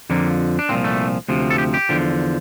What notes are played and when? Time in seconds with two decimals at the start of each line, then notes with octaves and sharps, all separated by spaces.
0.10 F2 D3 F3 A#3
0.59 D4
0.69 C2 A#2 F3 C4
0.84 A3
1.28 D2 C3 F3
1.50 A4
1.58 G4
1.74 G4
1.89 E2 D3 F3